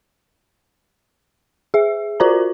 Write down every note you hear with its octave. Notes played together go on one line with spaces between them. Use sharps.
G#4 E5
F4 F#4 A#4 C5 D5 A#5